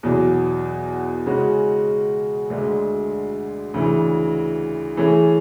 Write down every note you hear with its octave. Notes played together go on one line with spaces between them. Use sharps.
E2 B2 F#3
C#3 G#3 C#4 F#4
D2 D3 G#3
D2 C#3 E3
E3 A3 C#4 G#4